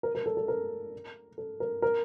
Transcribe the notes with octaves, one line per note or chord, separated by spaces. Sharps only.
A#4
A#4
A4
A4
A#4
A4
A#4
A#4